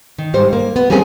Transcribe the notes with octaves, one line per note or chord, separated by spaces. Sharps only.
D#3
G#2 G3 C5
A#3
B3
G3 A#3 C4 C#4 G#4